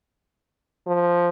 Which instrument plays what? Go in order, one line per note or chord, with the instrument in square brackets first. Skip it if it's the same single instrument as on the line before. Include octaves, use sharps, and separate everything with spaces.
[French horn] F3